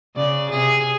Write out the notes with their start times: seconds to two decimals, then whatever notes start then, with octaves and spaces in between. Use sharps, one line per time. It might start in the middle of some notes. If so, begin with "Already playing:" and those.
0.16 C#3 D5
0.50 C3 G#4